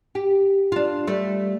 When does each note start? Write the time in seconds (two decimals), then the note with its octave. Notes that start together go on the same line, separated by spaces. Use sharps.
0.15 G4
0.72 D4 F4
1.07 G3 A3